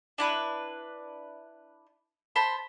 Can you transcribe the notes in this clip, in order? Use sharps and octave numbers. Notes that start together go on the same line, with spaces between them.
D4 E4 B4
C5 A5 B5